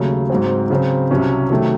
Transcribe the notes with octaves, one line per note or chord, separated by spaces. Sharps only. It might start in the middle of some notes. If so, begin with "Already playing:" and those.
Already playing: D#2 C#3 F#3 A3
G#2 F#3 C4
C#3 F#3 C4
C2 C3 F#3 C#4
C3 D#3 F#3 A3